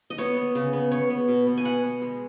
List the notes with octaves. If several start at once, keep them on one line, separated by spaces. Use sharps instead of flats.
D#5
B3 C#5
B3
C#3
B3
B3 C#5
B3
B2
B3
G#5
B3 F#5
B3
G#3